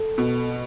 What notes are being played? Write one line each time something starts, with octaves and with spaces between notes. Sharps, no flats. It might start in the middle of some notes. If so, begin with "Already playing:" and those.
Already playing: A4
B2